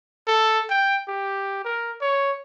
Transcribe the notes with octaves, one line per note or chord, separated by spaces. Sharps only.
A4
G5
G4
A#4
C#5